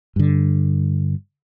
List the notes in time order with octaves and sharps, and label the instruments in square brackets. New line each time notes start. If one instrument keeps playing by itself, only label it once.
[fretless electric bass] G2 D3